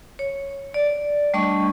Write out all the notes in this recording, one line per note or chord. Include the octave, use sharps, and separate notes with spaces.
C#5
D5
G3 A3 D4 D#5 C#6